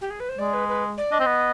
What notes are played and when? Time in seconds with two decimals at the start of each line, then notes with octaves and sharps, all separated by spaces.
0.01 G4
0.10 G#4
0.20 B4
0.29 C5
0.38 G#3 D5
0.53 B4
0.68 B4
0.97 D5
1.11 D4 D#5
1.19 C4
1.26 B3